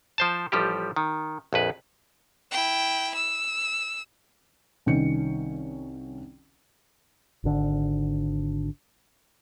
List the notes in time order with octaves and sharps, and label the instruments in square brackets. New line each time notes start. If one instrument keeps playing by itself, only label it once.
[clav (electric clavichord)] F3 C5 A5
A1 F3 G3 G4
D#3
A#1 F2 B4
[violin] E4 G5
E6
[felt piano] C2 D#3 C#4 C#7
[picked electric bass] G#1 D3